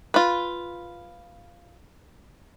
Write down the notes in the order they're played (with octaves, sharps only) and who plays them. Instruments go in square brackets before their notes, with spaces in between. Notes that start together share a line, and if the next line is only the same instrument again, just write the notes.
[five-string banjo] F4 B4